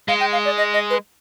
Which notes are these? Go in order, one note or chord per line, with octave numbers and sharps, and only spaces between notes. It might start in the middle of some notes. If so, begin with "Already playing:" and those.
G#3 F5
G5
F5
D5
D#5
D#5
B4